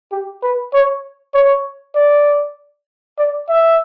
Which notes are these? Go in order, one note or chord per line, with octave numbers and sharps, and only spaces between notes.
G4
B4
C#5
C#5
D5
D5
E5